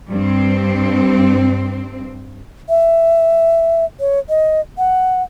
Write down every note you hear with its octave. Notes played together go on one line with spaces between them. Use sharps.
G2 C4
E5
C#5
D#5
F#5